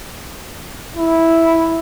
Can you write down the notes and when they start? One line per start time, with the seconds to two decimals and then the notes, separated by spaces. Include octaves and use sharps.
0.97 E4